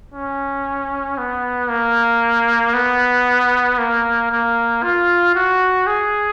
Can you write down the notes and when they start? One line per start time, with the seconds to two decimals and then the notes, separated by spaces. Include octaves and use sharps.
0.14 C#4
1.18 B3
1.70 A#3
2.74 B3
3.79 A#3
4.31 A#3
4.83 F4
5.35 F#4
5.87 G#4